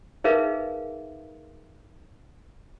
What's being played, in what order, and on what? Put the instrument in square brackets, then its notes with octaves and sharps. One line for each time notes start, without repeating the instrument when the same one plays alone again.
[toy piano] D#4 G#4 A#4 B4 E5 F5